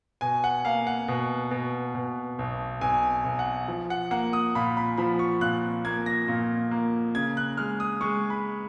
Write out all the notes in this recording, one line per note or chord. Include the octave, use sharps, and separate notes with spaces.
B2 G#5
F#5
A#3 F5
F#5
B2
B2
B2
B1
B1 G#5
B1
F#5
F3
F#5
A#3 F#5
D#6
A#2 B5
B5
F3 B5
C#6
A#2 F#6
A#3 G#6
A#6
A#2
A#3
C#3 G#6
F#6
G#3 F6
D#6
G#3 C#6
B5